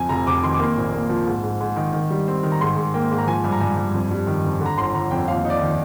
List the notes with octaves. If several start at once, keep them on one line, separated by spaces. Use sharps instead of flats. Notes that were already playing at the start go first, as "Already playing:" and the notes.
Already playing: F2 G#5
F1 A#5
F1 D6
D#3 C6
D6
A#3 C6
A#1
A#3
F3
G#2
G#2
G#2
D#3
D#3
G3
C4
D#3
A#5
G#2 C6
G#2
A#3 G5
G#2
A#5
F3 G#5
G2
A#5
G2 G#5
G2
F2
G3
D#3
F2
D3
A#5
G1 C6
G1 A#5
F2 G5
D#2 F5
D#4
D5
D#3